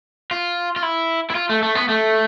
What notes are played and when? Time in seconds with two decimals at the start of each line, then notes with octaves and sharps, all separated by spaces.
0.31 F4
0.76 F4
0.83 E4
1.30 E4
1.35 F4
1.49 A3
1.63 A3
1.75 B3
1.89 A3